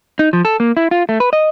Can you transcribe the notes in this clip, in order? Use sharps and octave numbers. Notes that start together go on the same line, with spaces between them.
D#4
F3
A4
A#3
E4
F4
A3
B4
D#5